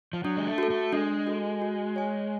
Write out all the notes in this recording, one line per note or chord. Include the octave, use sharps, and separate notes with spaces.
F3
F#3 D4
G#3
A3
F#4 A4
A3
G#3 D4
F#4 A4
F#4
C#5 G#5